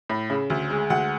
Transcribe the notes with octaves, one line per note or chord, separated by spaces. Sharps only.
A2
C#3
D2
G#3
D2 F#5